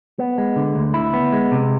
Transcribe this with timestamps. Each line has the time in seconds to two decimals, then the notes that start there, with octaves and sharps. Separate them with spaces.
0.19 B3
0.38 G#3
0.56 D3
0.75 D2
0.94 E4
1.14 B3
1.33 G#3
1.52 C3